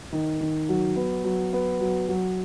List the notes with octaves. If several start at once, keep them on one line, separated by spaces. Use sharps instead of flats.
D#3
D#3
F#3
B3
F#3
B3
F#3
F#3